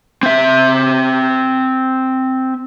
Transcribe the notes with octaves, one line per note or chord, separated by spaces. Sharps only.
C4 E5